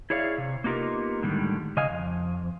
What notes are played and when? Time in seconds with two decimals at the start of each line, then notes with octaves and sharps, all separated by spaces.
0.10 E4 G#4 C#5 D5 E5 F5
0.38 C3
0.64 A#3 B3 D#4 F4 G4 A#4
1.22 A2 D3 D#3 G3 G#3
1.77 C#3 D#5 F5 G#5
1.90 F2